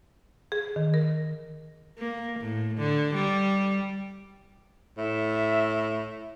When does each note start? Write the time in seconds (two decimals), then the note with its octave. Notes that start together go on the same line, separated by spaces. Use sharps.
0.52 G#4
0.76 D#3
0.94 A#4
1.99 A#3
2.40 A2
2.78 D3
3.15 G3
4.98 A2 E5